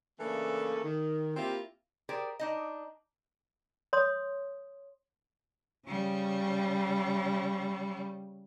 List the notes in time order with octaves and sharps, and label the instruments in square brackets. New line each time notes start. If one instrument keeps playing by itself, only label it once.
[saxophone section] C#3 E3 A3 A#3 D4 A4
D#3
A#3 C4 E4 F4 G4
[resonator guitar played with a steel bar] G4 G#4 A#4 C5 D5 G5
D4 D#4 D#5
[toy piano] C#5 C6 D#6
[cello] C#3 G3